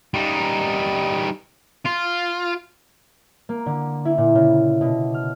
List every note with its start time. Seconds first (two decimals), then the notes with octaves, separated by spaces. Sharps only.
0.14 G3 D#4
1.85 F4
3.49 A#3
3.66 D3
4.05 E4
4.18 A#2
4.35 C#3
4.81 B2
5.14 F6